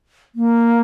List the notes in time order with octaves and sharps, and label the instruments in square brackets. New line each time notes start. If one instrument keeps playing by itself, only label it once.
[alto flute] A#3